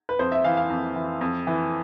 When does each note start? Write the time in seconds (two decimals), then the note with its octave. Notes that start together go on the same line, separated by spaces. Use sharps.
0.09 B4
0.19 F2 C5
0.32 E5
0.44 E3 F5
0.57 F5
0.70 F2
0.96 E3
1.21 F2
1.47 E3